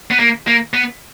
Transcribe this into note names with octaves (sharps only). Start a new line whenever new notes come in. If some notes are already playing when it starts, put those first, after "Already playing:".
B3
A#3
A#3
B3